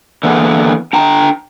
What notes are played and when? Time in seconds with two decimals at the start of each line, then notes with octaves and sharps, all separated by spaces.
0.23 D3 E3 A#3 B3 G#4
0.93 D4 G5 A#5